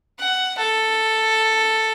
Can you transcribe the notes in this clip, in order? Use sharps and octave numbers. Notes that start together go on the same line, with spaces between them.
F#5
A4